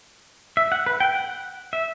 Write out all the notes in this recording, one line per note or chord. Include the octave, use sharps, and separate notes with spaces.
E5
F#5
B4
G5
F#5
E5